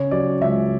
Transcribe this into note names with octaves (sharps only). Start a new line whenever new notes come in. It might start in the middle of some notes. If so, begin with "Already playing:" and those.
Already playing: C#3 C#5
F#3 D5
C#2 E5